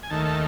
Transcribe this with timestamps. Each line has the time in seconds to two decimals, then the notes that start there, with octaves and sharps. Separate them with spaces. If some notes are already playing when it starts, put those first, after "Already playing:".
0.03 G#5
0.10 D#2 D#3 A3 A5
0.25 A5